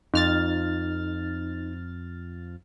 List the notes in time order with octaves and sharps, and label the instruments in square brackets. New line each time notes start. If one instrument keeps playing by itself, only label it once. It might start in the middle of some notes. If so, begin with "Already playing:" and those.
[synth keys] F2 F6 A6 [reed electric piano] D#4